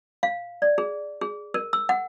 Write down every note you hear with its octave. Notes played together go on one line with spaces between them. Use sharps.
F5
D5
G#4
G#4
A#4
E6
F#5